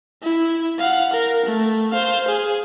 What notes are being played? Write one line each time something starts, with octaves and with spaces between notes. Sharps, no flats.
E4
F5 F#5
A#4
A3
C5 F5
G#4